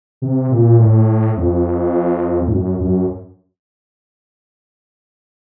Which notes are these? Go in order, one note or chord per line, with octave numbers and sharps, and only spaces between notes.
C3
A#2
A2
F2
A2
F#2
F#2